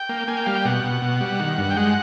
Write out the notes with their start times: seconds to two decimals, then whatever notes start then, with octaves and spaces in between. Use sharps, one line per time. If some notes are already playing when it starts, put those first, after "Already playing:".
Already playing: G5
0.09 A#3
0.28 A#3 G#5
0.37 G5
0.46 G3 F5
0.56 G5
0.65 B2 F#5
0.84 B2
1.02 B2
1.21 G3
1.40 D#3
1.58 G2
1.70 G5
1.77 G#3 F#5